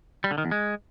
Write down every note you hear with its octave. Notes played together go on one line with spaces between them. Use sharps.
G3
D3
D#3
E2
G#3